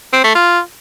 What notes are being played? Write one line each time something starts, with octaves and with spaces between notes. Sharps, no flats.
C4
A3
F4